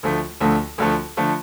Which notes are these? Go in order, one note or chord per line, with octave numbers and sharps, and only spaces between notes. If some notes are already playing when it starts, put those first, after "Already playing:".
D2 D3 F3 A3
D2 D3 F3 A3
D2 D3 F3 A3
D3 F3 A3